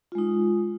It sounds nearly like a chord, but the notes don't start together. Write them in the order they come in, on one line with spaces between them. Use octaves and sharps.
F4 G#3 D#4